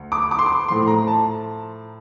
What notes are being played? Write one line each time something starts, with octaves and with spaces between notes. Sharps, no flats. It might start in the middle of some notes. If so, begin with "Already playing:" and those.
Already playing: D2
D6
D6
C6
D6
A2 F3 C6
A#5
A5